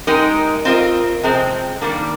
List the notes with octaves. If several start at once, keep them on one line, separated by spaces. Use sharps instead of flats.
G#3 D#4 G4 A#4 D#5
C4 F4 A#4 D#5
C3 F3 G#3 C4
D#3 G3 A#3 D4